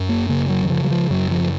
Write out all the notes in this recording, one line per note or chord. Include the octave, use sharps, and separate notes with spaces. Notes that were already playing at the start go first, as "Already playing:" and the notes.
Already playing: F#2
A#3
C#3 A#3
F#3
D#3
C#3 F3
F#3
F3
F#2 F#3
F3